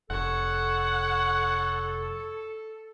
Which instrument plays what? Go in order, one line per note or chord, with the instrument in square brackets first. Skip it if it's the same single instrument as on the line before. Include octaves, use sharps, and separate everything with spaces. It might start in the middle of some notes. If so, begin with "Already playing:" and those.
[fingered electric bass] F1 [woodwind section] A4 [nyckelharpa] C#5 [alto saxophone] F#5